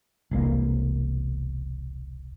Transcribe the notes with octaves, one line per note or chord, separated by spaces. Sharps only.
E1 C2 A#3